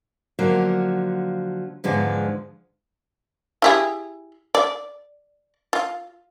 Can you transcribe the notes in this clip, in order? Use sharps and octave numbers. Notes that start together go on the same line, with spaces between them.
D3 F3 F#3 A#3
E2 G#2 D3 F3 G#3
E4 G4 G#4
D5
F4